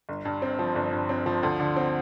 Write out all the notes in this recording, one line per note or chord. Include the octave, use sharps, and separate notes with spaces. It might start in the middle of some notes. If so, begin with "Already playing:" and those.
G1
G2
C4
F3
G1
G2
C4
F3
D2
D3
C4